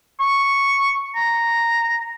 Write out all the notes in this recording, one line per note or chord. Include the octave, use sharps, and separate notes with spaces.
C#6
A#5